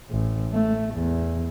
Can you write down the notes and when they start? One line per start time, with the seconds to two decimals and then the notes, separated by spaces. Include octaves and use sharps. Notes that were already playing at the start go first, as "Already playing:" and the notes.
0.11 A1
0.53 A3
0.95 E2